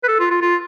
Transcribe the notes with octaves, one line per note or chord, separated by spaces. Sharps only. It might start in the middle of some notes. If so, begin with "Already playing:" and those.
B4
A4
F4
F4
F4